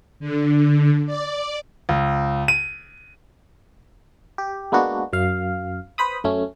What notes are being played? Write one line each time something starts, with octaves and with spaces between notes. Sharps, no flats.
D3
D5
C#2
D#7
G4
G#3 A#3 B3 D4 F#4
F#2 F5
B4 C5 B5 D#6
F#2 A3 C#4